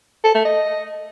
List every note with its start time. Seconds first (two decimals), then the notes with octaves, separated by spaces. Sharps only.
0.24 A4
0.35 A3
0.45 D#5